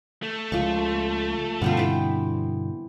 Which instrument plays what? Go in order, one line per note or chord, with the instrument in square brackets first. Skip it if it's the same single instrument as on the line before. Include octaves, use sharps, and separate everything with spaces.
[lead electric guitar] A3
[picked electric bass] C#2 [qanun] F3 C#6
[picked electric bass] G2 B2 D3 [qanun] B3 C4 F4
[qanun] E3 G5